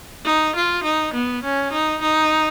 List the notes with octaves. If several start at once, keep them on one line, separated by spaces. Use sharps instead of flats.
D#4
F4
D#4
B3
C#4
D#4
D#4